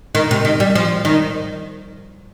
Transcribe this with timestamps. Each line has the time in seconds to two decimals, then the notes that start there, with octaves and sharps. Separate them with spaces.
0.15 D#3
0.31 C3
0.45 D#3
0.60 G3
0.75 F3
1.05 D#3